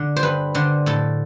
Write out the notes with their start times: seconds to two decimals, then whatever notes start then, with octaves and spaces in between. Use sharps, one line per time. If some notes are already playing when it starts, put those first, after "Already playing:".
Already playing: D3
0.16 C5
0.23 G2 B4
0.55 D3 C5
0.86 A2 A4